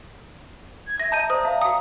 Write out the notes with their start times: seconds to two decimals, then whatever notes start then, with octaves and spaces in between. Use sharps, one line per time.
0.88 G#6
1.00 E5 A#6
1.12 D#5 E5 A5 A#5 G6 D#7
1.30 C5 D5 A#5 D#6
1.44 E5 F5 A5
1.61 F#4 G5 D#6